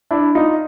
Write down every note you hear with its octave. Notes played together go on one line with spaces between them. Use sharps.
D4 E4
D#4 F4